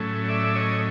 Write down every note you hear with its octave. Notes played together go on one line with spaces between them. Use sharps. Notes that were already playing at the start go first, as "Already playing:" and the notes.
Already playing: A2 F#3 A3 C#4
D5 E5
C#5 D#5